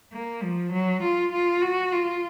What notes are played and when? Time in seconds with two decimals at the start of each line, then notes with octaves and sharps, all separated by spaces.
0.13 A#3
0.43 F3
0.73 F#3
1.03 F4
1.33 F4
1.62 F#4
1.92 F4